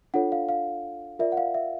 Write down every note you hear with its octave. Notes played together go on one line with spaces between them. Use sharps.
D4 F4 A4 C#5 F#5
F5
F5
F4 A#4 D5 E5
F#5
F5
E5